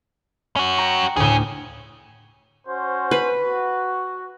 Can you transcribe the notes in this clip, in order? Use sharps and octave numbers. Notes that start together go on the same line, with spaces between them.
C#4 F#4
G5 A#5 C#6
D2 A2 C#4 G#4
C#4 F#4 C5
B4
F#4